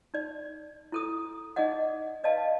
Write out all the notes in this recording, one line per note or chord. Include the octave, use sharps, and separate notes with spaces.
D#4 D5
E4 A4 D#6
D#4 G#4 D5 D#5 F#5
B4 D5 D#5 F5 A5